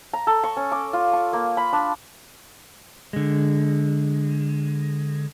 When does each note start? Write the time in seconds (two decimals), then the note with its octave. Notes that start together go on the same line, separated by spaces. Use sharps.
0.13 A#5
0.27 A4
0.44 C#6
0.57 C#4
0.72 D6
0.93 F4
1.13 C#6
1.33 A#3
1.57 B5
1.73 D4
3.13 D3 G#3